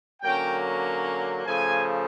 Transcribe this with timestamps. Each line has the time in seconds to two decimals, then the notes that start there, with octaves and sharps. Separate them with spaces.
0.22 D3 F#3 A#3 C#4 G5
1.45 C#3 F3 A3 G#5